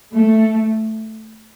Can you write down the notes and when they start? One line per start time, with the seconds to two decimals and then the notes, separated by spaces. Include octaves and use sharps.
0.14 A3